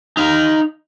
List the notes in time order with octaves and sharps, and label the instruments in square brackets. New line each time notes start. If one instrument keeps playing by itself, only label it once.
[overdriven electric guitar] D#4 F5